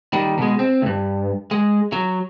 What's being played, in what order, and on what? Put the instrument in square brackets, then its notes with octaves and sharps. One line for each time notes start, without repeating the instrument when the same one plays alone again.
[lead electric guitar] D#3 G3
B2 G#3
C4
D2 G2
G#3
F#3